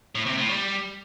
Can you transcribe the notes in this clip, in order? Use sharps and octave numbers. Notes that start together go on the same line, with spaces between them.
A2
C3
A2
G3